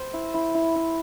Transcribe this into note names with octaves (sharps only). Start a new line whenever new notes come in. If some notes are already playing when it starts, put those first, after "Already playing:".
Already playing: C5
E4
E4
E4
E4